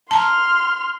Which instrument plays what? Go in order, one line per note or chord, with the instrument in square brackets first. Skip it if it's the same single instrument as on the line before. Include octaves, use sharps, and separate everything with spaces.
[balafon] A5 A#5 [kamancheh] C6 F6